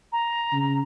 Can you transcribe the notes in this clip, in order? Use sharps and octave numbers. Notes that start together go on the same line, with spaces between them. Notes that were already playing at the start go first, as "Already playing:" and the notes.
A#5
C#3